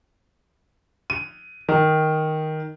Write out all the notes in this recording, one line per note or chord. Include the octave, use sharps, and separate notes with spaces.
D#7
D#3